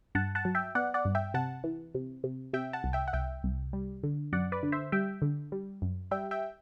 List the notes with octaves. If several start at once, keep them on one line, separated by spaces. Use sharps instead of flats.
G2 F#5 A5
F#5 A5
F#3
E5 G5
B3 D5 F#5
D5 F#5
G2
E5 G5
C3 F#5 A5
E3
C3
C3
C3 E5 G5
F#5 A5
C2
E5 G5
F#5
C2 E5 G5
C2
G3
D3
F#2 D5 F#5
B4 D5
D3
C5 E5
G3 E5 G5
D3
G3
F#2
G3 E5 G5
E5 G5